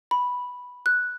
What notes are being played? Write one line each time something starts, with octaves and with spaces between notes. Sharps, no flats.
B5
F#6